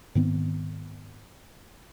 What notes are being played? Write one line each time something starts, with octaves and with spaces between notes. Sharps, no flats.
G#2 D#3 B3 C4